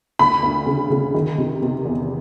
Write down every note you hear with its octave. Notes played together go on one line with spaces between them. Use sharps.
D2 B5
D2
C#3
C#3
D#3
C3
C3
E2